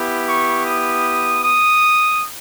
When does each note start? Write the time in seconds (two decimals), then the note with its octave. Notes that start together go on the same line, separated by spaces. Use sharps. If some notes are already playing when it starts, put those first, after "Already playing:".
Already playing: B3 E4 G4
0.28 C#6
0.66 D#6
1.43 D#6